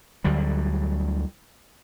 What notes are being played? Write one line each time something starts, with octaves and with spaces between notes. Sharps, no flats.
D2 D3 F#3 G3